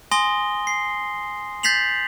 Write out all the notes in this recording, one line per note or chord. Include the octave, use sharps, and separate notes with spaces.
G#5 C6 D#6 A#6 G7
C7
G6 A6 B6 C7 F7 F#7